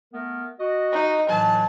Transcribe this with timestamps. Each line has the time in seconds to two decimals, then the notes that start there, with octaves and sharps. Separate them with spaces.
0.13 A3 B3 A#4
0.60 F#4 D#5
0.92 D#4
1.29 A2 E3 F#3 A5